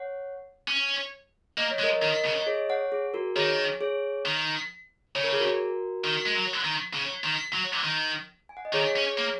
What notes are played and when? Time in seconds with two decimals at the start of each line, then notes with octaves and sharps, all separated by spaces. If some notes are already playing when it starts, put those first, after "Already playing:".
Already playing: C#5 F#5
0.68 C#4
1.58 A#3 D#5
1.71 C#5
1.79 G#3
1.83 A#4 D#5
2.02 D#3 A#4 D#5
2.25 C#3
2.41 D#5
2.47 G#4 C#5
2.69 C#5 F#5
2.92 G#4
3.14 F#4 A#4
3.36 D#3 G#4 C#5
3.81 G#4 C#5
4.26 D#3
5.15 C#3 C#5
5.23 A#4
5.33 G#4
5.40 F#4 A#4
6.05 D#3
6.26 G#3
6.35 F#3
6.64 D#3
6.94 C#3
7.24 D#3
7.53 F#3
7.83 D#3
8.49 G#5
8.57 F#5
8.65 D#5
8.73 D#3 G#4 C#5
8.96 C#4
9.18 A#3